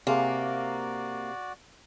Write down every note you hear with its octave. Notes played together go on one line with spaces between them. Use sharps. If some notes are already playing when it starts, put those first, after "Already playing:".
C3 A#3 F#4 G#4 D5 F5 G#5